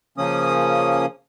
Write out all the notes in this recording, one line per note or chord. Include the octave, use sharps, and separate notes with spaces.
C#3 F3 A#3 C#4 D#6